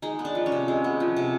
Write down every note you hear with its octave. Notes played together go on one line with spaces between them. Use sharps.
G#3 D#4
B3
D4
F3
C#4
C3
G#3
B3
F3
C3